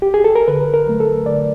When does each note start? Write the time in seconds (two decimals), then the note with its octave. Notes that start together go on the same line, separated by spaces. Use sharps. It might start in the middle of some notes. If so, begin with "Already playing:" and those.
0.02 G4
0.14 G#4
0.24 A4
0.36 A#4
0.48 D3 B4
0.74 A#4
0.87 F#3 A3
1.00 A4
1.26 D3 D5